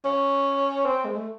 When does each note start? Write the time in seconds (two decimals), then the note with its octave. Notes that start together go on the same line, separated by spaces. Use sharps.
0.05 C#4
0.86 C4
1.05 G#3
1.16 A3